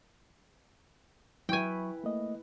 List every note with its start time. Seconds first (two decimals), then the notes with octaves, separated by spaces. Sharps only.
1.49 F#3 E4 B4 G5 G#5 C#6
2.04 A3 A#3 D#5